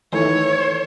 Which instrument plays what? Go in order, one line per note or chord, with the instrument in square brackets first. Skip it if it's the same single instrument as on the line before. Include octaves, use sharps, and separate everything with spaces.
[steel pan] D#3 E3 A3 [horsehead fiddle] C#5